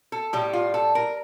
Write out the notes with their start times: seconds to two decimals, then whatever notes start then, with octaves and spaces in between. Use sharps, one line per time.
0.12 A4
0.33 A2 G3 G4
0.53 F4
0.74 A4
0.95 A#4